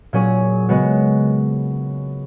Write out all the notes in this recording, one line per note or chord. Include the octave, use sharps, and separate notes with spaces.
A#2 F#3 C#4 G#4
C#3 G#3 B3 F#4